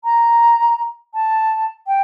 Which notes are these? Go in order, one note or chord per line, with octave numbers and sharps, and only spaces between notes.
A#5
A5
G5